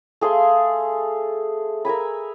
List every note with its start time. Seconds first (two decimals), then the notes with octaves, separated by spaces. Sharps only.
0.21 A3 G#4 F5 C6
1.85 A#4 E5 G#5 B5